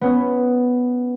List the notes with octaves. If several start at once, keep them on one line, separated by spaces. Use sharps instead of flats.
B3 C#4